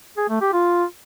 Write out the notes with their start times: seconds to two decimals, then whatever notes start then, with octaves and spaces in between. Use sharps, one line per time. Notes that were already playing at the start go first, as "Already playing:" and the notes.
0.17 G#4
0.29 A3
0.41 G4
0.53 F4